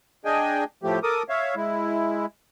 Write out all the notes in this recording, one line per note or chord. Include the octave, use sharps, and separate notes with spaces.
D4 G#4 D#5 G5 G#5
A2 F3 A3 G4
A4 A#4 D6 D#6
C#5 E5 F5
G#3 E4